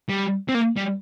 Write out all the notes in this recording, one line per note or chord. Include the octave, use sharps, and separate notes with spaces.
G3
C4
A#3
G3